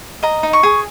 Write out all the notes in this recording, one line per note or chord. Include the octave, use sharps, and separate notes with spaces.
D#5 A#5
D#4
C#6
G#4